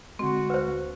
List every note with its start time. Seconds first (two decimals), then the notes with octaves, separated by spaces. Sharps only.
0.19 D3 G#3 C4 F#4
0.50 D2 B4 C5